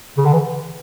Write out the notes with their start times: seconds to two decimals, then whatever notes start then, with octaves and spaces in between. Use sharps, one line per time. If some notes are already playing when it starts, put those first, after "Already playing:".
0.17 C#3
0.25 D3
0.33 E3